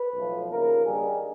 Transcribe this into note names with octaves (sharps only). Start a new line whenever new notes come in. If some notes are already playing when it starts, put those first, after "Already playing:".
Already playing: B4
B1 A2 F3
D#2 C#3 F3 A#3 A#4
G2 D#3 G3 A#3 G#4